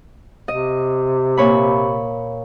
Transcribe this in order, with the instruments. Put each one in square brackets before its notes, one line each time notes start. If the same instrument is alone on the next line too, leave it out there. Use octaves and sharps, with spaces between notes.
[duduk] C3 [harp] D#5
[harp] A#2 C#5 B5